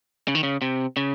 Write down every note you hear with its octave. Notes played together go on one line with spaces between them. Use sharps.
C#3
D#3
C#3
C3
C#3